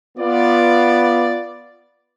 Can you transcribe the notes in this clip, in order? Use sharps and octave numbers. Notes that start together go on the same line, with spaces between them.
B3 F4 D5